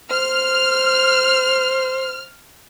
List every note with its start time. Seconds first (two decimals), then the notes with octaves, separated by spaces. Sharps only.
0.11 C5 F6